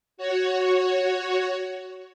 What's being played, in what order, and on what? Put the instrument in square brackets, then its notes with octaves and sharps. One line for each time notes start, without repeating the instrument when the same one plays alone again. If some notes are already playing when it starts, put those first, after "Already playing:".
[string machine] F#4 C#5